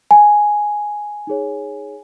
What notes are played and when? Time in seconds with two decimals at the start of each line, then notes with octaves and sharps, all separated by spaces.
0.11 G#5
1.27 D#4 G#4 C#5